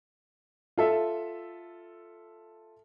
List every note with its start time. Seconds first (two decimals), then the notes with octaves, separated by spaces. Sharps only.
0.78 F4 A4 E5